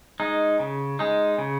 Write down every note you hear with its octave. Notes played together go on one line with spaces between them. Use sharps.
G#3 D#4
C#3
G#3 D#4
C#3